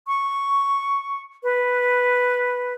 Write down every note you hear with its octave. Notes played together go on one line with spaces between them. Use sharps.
C#6
B4